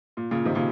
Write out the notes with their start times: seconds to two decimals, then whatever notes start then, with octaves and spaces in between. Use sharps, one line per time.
0.17 A#2
0.31 A#2 C#3
0.45 C3 D#3
0.55 A#2 C#3